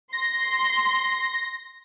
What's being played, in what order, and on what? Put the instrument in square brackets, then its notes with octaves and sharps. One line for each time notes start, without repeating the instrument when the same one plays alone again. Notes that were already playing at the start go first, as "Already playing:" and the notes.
[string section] C6 [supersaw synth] A#6